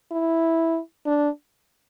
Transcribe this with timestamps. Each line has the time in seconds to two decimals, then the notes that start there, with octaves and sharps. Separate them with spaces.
0.12 E4
1.06 D4